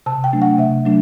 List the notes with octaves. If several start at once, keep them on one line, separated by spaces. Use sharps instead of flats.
C3 A5
G5
F#3 A3 D4
F#5
C3 E5
F#3 A3 D4